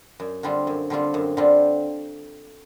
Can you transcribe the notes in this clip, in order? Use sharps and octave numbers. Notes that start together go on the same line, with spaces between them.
F#2
D3 G3 C4 F4
F#2
D3 G3 C4 F4
F#2
D3 G3 C4 F4